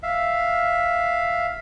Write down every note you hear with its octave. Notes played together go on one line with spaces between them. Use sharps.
E5 F5